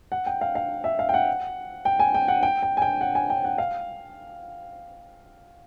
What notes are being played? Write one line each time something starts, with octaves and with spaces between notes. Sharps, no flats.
F#5
G5
F5
F5
E5
F5
G5
F#5
G5
G#5
G5
F#5
G5
G5
G#5
G5
F#5
G#5
G5
F#5
F5